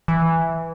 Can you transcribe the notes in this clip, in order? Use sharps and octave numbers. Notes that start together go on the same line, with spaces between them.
E3